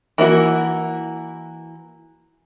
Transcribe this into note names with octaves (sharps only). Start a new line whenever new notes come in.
E3 A#3 E4 F#4